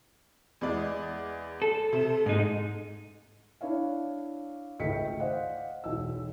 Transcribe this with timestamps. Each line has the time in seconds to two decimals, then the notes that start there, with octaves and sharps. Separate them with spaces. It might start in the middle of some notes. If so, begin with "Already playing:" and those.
0.61 E2 G#3 D5
1.62 A4
1.92 C3
2.26 G#2 G#3 D#4
3.61 D4 E4 C#5 F5
4.79 G#1 C#2 A3 G5 B6 C#7
5.19 C5 D5 D#5 F5 F#5
5.84 E1 B1 E6